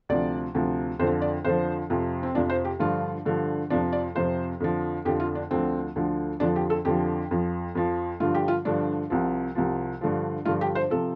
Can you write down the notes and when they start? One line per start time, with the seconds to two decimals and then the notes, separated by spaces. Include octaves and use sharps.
0.09 D2 C3 F3 D5
0.55 D2 C3 F3
0.99 F2 C5
1.02 D3 F3
1.22 D5
1.44 F2 D3 F3 C5
1.90 F2 C3 F3
2.23 C4
2.35 F2 C3 F3 D4
2.50 C5
2.65 G4
2.79 G2 D3 F3 F4
3.25 G2 D3 F3
3.70 F2 C3 F3 D4
3.93 D5
4.15 F2 C3 F3 C5
4.60 F2 D3 F3
5.05 F2 D3 F3 G4
5.20 F4
5.35 D4
5.51 D2 D3 F3 C4
5.96 D2 D3 F3
6.40 F2 D3 F3 D4
6.56 G4
6.70 A4
6.85 F2 D3 F3 G4
7.31 F2 F3
7.75 F2 F3
8.20 G2 D3 F3 F4
8.35 G4
8.48 F4
8.65 G2 D3 F3 D4
9.10 C2 C3 F3
9.55 C2 C3 F3
10.01 G2 D3 F3
10.45 G2 D3 F3 F4
10.61 G4
10.75 C5
10.90 C3 F3 A4